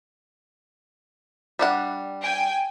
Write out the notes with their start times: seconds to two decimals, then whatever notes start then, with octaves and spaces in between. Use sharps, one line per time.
1.59 G3 D4 F#5
2.23 G5 G#5